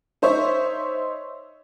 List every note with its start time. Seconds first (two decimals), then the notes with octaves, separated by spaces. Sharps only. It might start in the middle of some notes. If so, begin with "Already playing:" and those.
0.22 D#4 C5 C#5 E5